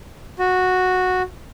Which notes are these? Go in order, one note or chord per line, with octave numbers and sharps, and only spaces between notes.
F#4